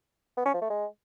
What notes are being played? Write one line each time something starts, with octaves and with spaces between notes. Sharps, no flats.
B3
C#4
F3
A3
G#3